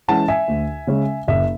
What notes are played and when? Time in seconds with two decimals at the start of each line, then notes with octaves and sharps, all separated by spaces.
0.08 E3 G#3 C#4 E4 F#5 A5
0.28 E5 G#5
0.48 D2
0.87 C#3 G#3 C#4
1.28 F#1 E5